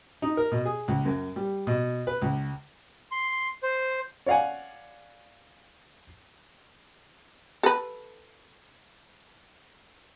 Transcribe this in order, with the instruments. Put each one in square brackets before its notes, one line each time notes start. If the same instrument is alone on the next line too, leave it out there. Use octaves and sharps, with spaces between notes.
[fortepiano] D#4
A#4
B2
G#4
C#2
F#2
G3
B2
B4
C#2
[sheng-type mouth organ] C6
C5
[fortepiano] C#5 D5 F5 F#5 G#5
[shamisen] A4 B4